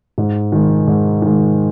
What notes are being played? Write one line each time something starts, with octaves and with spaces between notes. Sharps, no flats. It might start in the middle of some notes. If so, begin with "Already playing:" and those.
G#2
D#3 G#3
G#2
D#3 G#3